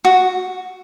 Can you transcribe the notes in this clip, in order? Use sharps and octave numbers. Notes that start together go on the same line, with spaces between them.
F#4